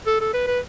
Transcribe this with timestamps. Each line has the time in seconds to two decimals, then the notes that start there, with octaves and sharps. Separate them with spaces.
0.07 A4
0.21 A4
0.34 B4
0.47 B4